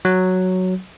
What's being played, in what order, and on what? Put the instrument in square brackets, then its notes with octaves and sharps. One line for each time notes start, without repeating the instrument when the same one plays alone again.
[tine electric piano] F#3